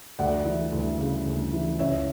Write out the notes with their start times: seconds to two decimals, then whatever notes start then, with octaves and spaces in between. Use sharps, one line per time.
0.19 D2 D5 F#5
0.45 E3
0.72 D2
0.99 C#3
1.26 D2
1.53 E3
1.79 C#2 C#5 E5